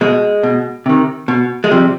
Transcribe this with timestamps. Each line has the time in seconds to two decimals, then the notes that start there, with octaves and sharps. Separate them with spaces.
0.01 B2 G#3
0.43 B2
0.86 C3 D#3
1.28 B2
1.64 G#3
1.71 C3 F3 G3